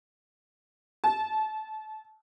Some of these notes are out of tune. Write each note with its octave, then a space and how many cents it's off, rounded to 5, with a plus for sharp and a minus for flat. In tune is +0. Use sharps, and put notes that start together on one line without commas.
A5 -25